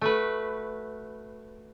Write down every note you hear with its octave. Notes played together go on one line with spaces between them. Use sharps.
A3 F#4 B4